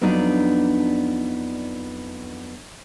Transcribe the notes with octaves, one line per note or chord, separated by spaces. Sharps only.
F2 F#3 B3 D4 D#4 D5